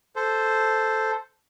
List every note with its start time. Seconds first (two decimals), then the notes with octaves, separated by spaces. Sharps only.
0.16 A4 C5